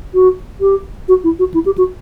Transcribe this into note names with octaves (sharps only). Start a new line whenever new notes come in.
F#4
G4
F#4
E4
F#4
E4
G4
F#4